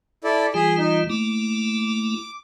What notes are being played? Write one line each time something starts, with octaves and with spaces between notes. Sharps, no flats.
E4 A4 D5
E3 G3 F4 G#4
D#4
A3 A#3 E4 D6